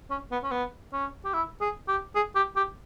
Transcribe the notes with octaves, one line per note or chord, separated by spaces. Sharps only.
C#4
B3
C#4
B3
C#4
G4
E4
G#4
G4
G#4
G4
G4